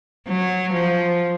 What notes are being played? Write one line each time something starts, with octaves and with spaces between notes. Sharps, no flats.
F#3
F3